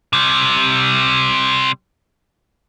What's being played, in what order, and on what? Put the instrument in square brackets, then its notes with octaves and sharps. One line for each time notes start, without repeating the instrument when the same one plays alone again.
[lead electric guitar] C3 G3